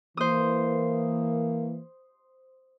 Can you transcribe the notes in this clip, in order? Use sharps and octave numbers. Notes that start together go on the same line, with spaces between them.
E3 A#3 C5 D#6